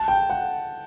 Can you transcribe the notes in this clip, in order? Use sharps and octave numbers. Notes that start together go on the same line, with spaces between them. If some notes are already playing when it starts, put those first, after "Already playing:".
Already playing: A5
G5
F#5